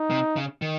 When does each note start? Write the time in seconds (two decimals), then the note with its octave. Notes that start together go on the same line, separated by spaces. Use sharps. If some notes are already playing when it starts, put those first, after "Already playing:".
Already playing: D#4
0.11 C3
0.36 C#3
0.62 D#3